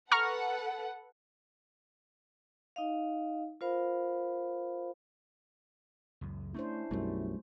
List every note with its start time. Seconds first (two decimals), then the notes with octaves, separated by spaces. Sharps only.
0.12 A4 B4 F#5 A#5 C#6 F6
2.76 D#4 D#5 F5
3.61 F4 A#4 C5 F5 B5
6.21 C#2 F#2
6.54 A3 C#4 D4 E4 C5
6.91 B1 F#2 G3 A3